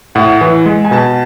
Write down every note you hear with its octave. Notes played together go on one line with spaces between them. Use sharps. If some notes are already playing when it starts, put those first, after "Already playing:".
A2 F#5
E3
G#3
G#5
B2 A5